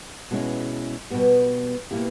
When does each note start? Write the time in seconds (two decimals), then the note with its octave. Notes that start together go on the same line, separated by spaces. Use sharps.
0.31 B2 G#3 C#4 E4
1.10 B2 G3 B3 G4
1.91 B2 A#3 E4 G4